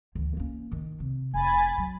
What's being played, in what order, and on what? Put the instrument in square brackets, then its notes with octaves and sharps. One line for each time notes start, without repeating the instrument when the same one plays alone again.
[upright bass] D2 E3
A#3 C#4
D#3 D4
C3
[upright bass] F1 [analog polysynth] G#5 B5 A6
[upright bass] F#3